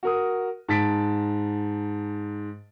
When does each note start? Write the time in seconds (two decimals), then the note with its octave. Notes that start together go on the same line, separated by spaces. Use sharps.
0.03 F#4 A#4 D#6
0.68 G#2 A5 A6 B6 D7